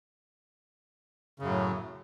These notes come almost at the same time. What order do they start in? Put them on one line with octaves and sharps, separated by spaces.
C#3 F#2 F#3 A2